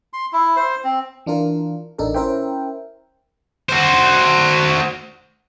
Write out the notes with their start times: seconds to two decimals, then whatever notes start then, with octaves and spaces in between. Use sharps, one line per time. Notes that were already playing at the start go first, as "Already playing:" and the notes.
0.13 C6
0.33 E4
0.57 C5
0.84 C4
1.26 E3 D4 F4 A#4
1.98 A1 D4 D#4 A4 A#4
2.14 C#4 E4 A#4 C5 E5 G5
3.69 F#4 C5